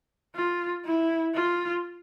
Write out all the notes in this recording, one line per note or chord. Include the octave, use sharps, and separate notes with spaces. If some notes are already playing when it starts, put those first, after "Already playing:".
F4
E4
F4